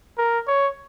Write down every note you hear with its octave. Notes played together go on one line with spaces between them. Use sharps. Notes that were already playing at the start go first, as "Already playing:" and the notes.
A#4
C#5